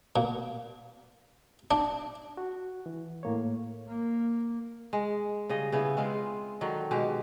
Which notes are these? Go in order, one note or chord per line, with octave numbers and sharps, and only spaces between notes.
A#2
D4
F#4
E3
A2 A#3 C#5
A#3
G#3
C#3 G3 D#5
C#3 B3 E4
G#3 C4 F4
D3 D#3 F#3
B2 G#3 G4